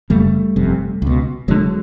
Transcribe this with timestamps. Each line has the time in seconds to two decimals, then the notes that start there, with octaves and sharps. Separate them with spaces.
0.10 F#1 F#2 C#3 G3 A3
0.56 G1 F2 C3
1.02 C#2 B2
1.48 E1 D2 D3 F#3 G#3